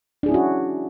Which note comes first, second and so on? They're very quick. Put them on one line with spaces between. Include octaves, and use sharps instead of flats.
D4 G#4 E4 C#4 F#4